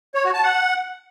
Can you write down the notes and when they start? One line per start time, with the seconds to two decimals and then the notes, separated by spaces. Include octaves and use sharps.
0.15 C#5
0.24 F#4
0.34 A5
0.43 F#5